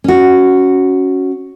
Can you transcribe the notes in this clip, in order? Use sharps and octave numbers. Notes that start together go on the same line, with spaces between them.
C#4 F#4